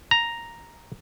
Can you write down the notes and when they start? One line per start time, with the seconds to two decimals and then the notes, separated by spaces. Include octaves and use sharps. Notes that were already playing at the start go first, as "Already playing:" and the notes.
0.11 A#5